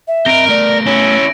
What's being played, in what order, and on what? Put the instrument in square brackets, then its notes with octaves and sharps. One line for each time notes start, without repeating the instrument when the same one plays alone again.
[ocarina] E5
[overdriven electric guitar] C4 D#5 [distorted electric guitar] A#4 [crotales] A#6 D7
[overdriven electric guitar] A3 B3 [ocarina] D5
[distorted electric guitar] C#4 E4 [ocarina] C#5